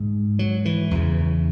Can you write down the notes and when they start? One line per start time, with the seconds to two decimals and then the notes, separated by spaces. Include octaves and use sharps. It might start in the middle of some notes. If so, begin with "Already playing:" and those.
Already playing: G#2
0.39 F#3
0.65 E3
0.91 E2 C#3